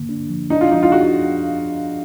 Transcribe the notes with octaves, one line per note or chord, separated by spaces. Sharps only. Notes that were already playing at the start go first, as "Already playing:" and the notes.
Already playing: D3 A#3
D4
F3
D4 D#4
F4
F3 D#4
F4
F#4 G#4